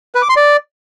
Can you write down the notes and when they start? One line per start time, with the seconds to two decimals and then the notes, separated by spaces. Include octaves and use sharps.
0.15 B4
0.22 D6
0.29 C6
0.36 D5